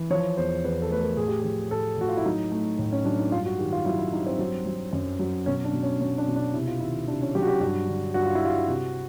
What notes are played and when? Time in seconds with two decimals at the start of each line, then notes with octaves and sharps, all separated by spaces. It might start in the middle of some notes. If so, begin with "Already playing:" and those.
Already playing: E3
0.10 F3 C#5
0.37 E2 C5
0.64 E2 B4
0.82 A4
0.90 A3 B4
1.00 A#4
1.17 A2 G#4
1.28 G4
1.40 F3 G#4
1.71 A2 A4
1.98 A2 F#4
2.08 F4
2.17 E4
2.25 F#3 D#4
2.51 A3
2.79 A2
2.92 C#4
3.05 F#3 D4
3.19 D#4
3.32 G2 F4
3.45 F#4
3.59 D#3 G4
3.72 F4
3.85 F#3 E4
3.99 E4
4.13 G2 D#4
4.26 C4
4.39 F#3
4.66 F#3
4.93 F#2
5.19 F#3
5.46 B2 C#4
5.65 D4
5.73 B2
5.83 C#4
6.01 B2 C#4
6.18 D4
6.27 B2
6.36 D4
6.54 C3 E4
6.67 F4
6.80 D#3 E4
7.08 C3 D4
7.22 C#4
7.35 F#3 G4
7.42 F#4
7.47 G4
7.61 G2 F#4
7.88 D3
8.14 G2 F#4
8.26 F4
8.35 E4
8.41 G3 F4
8.68 C3 F#4